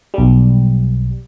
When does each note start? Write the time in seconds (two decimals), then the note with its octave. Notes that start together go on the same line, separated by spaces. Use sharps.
0.14 B1 G3